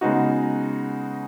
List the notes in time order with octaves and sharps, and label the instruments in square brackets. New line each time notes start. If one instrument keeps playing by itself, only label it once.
[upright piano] C#3 G#3 B3 D#4 F#4